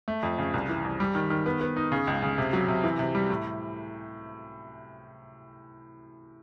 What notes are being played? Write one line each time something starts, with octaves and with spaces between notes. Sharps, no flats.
A3
F2
C#3
C2
E3
C2
G3
D#3
D#3
B3
B3
D#4
C#3
C#2
C#3
C3
F#3
C3
E3
C3
G3
A2